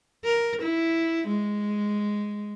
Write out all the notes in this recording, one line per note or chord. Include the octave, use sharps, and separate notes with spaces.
A#4
E4
G#3